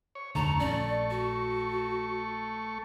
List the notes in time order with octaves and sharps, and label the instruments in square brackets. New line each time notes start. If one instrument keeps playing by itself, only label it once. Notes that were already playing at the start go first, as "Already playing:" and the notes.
[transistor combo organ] C#5
[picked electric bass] F1 D#2 D3 [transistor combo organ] A3 C#6 [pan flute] A#5
[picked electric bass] A#1 C#4 [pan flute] D5
[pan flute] F#4